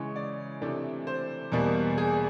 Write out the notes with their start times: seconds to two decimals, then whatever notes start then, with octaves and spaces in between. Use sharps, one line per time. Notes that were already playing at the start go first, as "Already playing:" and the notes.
Already playing: C#3 E3 G#3 C#5
0.16 D5
0.62 C3 E3 A3 D4
1.07 C5
1.52 E2 B2 G3 A#3
1.98 G#4